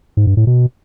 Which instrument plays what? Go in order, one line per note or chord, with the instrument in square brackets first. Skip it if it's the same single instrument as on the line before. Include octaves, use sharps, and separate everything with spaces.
[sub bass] G#2
G2
A2
B2